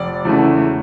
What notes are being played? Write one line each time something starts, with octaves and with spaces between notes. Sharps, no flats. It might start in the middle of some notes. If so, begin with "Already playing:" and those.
Already playing: F1 D5
E2 C#3 E3 A3